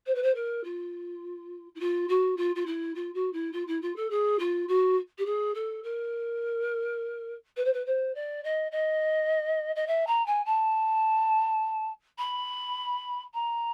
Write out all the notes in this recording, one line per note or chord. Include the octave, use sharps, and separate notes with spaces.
C5
B4
C5
A#4
F4
E4
F4
F#4
F4
F4
E4
F4
F#4
E4
F4
E4
F4
A4
G#4
F4
F#4
G4
G#4
A4
A#4
B4
C5
B4
C5
D5
D#5
D#5
D#5
E5
A#5
G#5
A5
B5
A#5